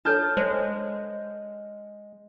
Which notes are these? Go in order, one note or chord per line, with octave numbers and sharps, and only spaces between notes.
D4 A4 C#5 A5 F6 G6
G#3 C5 C#5